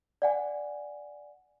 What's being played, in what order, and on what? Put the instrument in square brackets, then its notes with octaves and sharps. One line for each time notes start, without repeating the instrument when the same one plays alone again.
[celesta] D5 F#5 G#5